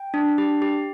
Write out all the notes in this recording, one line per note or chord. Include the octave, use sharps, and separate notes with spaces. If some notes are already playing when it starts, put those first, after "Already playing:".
Already playing: G5
D4
G4
G4